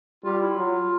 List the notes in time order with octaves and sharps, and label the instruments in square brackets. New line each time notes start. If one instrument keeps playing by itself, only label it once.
[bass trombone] G3 [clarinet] F4
[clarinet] E4
[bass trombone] F#3 [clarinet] F4